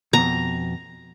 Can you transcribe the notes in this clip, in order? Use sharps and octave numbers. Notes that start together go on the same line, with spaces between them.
F2 B2 A#5